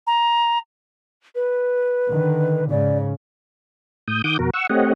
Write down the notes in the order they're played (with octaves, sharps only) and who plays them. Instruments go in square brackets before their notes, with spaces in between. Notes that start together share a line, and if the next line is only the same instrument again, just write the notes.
[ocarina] A#5
[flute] B4
[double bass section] D3 D#3
[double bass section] G#2 C#3 [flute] D5
[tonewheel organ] A2 D#6 G6
D#3 F#5 D6 D#6 G6
F2 B2 F#4 A#4
F#5 C#6 E6
A3 C4 G4 C#5 D#5 F#5